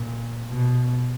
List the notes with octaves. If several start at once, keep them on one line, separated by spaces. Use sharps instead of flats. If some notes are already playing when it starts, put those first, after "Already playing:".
Already playing: A#2
B2